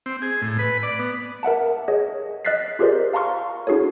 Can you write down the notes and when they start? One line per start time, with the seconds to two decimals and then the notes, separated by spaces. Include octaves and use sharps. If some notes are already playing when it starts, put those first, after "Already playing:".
0.06 C4
0.22 G#4
0.42 A2
0.59 B4
0.83 D5
0.99 B3
1.43 A#4 E5 F#5 A5
1.88 G#4 C#5 D#5
2.45 D#5 F6 F#6 A6 B6 C7
2.79 F4 G4 G#4 A#4 C5 D5
3.13 F5 A5 A#5 C6 C#6 F6
3.67 D4 E4 F#4 G#4 A4 C#5